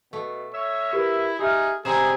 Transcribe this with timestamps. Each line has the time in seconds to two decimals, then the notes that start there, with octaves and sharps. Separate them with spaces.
0.13 B2 A3
0.54 C#5 E5
0.93 E4 G4 A#4 B4
1.39 D#4 G4 G#4 E5 F6
1.85 C3 G3 G#3 C4 G#4 A#5 E7